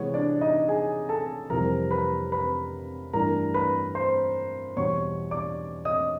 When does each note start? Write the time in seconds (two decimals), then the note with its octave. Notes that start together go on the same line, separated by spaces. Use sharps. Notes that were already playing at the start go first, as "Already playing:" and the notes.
Already playing: C3 E3 G#3 B3 C#5
0.14 D4 D5
0.41 D#4 D#5
0.68 G#4 G#5
1.09 A4 A5
1.50 F2 C3 E3 G3 A#4 A#5
1.91 B4 B5
2.32 B4 B5
3.13 G2 E3 A3 D4 A#4 A#5
3.54 B4 B5
3.95 C5 C6
4.77 E2 B2 G3 C#5 C#6
5.31 D5 D6
5.85 D#5 D#6